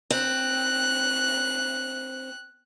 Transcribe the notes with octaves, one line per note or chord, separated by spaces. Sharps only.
C4 F#6